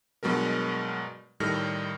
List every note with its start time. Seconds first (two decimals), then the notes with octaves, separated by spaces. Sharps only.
0.23 G2 B2 F#3 G#3 A#4
1.40 A2 D#3 G3 A4 F6 A#6